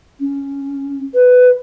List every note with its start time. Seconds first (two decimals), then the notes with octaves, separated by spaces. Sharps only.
0.20 C#4
1.14 B4